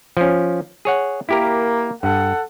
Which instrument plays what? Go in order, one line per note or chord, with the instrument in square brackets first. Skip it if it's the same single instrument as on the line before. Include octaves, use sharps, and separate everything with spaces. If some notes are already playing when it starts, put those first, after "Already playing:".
[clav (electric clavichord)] F3 C#4
G#4 C#5 F#5
[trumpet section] A#3 [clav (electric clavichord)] E4 G4 A#4
[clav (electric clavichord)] G2 [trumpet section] A4 F#5